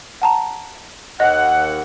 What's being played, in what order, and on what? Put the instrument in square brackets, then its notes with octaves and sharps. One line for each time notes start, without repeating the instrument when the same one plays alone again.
[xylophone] F#5 A5 A#5
[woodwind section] D#2 F#5 [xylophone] D#5